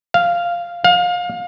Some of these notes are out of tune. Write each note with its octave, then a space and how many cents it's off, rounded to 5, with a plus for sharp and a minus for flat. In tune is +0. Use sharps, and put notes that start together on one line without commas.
F5 -5
F5 +30